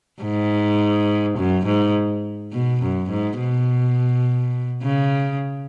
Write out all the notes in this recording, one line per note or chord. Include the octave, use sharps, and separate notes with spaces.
G#2
F#2
G#2
B2
F#2
G#2
B2
C#3